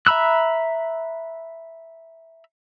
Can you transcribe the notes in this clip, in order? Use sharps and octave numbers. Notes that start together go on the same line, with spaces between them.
E5 A#5 B5 E6 F#6